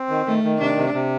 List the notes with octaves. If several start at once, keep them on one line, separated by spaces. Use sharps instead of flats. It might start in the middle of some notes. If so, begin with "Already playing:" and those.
Already playing: C4
D#3
D#3 A3
D#3
C3 D4
C3
C3